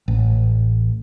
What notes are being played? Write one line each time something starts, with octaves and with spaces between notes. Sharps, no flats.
A1